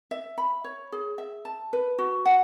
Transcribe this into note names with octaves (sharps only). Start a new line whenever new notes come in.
E5
B5
C#5
G#4
E5
A5
B4
F#4
F#5